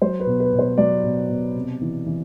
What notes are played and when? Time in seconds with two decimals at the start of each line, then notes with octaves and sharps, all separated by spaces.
0.02 F#3 C5
0.20 B4
0.26 B2
0.40 B4
0.53 B2
0.59 C5
0.78 F#3 D5
1.04 B2
1.29 B2
1.55 C3
1.81 E3
2.06 E3